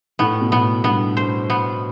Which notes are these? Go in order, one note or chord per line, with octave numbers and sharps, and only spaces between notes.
A2 B3
B2
A2 B3
G2 B3
C5
B3